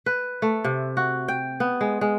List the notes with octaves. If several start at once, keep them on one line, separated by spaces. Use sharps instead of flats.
B4
A3
C3
F#4
G5
B3
G#3
G#3